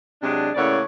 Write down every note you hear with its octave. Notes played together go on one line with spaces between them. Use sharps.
C3 F#3 G#3 D4
A2 C#3 A#3 C#5 D5 F#5